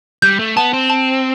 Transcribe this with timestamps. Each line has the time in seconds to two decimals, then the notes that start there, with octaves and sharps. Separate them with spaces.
0.22 G3 G6
0.39 A3
0.57 B3 A5
0.73 C4
0.90 A5